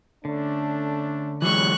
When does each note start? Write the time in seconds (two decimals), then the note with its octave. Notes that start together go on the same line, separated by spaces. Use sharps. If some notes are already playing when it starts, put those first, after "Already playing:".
0.25 D3 A3 C#4 D4
1.42 E3 F#3 G#3 C#6 F#6